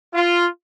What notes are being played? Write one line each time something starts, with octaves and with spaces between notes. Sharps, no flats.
F4